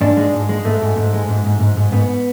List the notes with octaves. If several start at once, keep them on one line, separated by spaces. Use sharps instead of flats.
G#2 D4
G#3
G#2
G#3
G#2 A3
G#2
G#2
G#3
G#2
G#2
G#2
G#2
G#2 B3